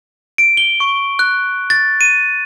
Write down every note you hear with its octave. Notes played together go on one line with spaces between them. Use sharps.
D7
G7
C#6
F#6
A6
D#7